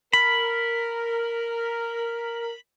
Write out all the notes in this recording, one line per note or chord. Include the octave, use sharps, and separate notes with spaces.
A#4 B5